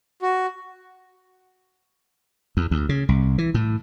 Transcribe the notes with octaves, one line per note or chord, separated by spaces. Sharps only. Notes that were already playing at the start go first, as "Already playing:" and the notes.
F#4
E2
D2
C#3
C2
E3
A2